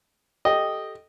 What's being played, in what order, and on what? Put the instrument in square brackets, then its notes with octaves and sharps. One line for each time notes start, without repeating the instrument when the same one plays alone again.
[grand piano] G4 A4 G5 [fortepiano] D#5